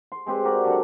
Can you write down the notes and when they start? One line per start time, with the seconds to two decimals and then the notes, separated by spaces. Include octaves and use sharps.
0.12 C6
0.26 G#3 C4 G4 B4
0.44 F#4 G4 A#4 D5
0.64 D3 F#3 A4 D6